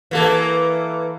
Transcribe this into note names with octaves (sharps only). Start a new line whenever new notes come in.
E3 A#3 A4